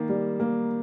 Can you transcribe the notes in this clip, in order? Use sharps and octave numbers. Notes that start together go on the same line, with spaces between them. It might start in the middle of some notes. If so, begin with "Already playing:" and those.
Already playing: D#3 A#3
G3
A#3